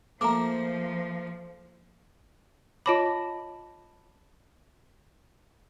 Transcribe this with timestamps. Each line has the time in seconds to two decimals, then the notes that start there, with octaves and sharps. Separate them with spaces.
0.21 F3 A3 A#3 A#5 D6
2.86 F4 C#5 D#5 A5 B5 D6